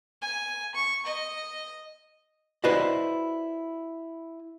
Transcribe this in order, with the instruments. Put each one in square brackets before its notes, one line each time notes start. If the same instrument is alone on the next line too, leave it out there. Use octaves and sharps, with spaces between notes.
[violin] G#5
C#6
D#5
[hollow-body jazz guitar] E4 F#4 B4 C5 D5 D#5